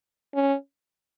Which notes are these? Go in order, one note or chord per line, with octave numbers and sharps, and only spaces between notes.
C#4